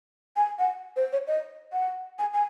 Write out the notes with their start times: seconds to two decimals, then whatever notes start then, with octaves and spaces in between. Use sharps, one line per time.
0.36 G#5
0.59 F#5
0.96 C5
1.13 C#5
1.27 D#5
1.73 F#5
2.19 G#5
2.34 G#5